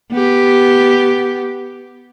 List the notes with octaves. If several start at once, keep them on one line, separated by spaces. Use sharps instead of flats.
B3 G4